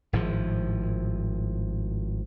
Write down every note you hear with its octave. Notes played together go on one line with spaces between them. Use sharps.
G#1 A2 F3